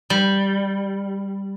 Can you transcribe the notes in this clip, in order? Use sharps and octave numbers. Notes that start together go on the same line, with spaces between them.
G3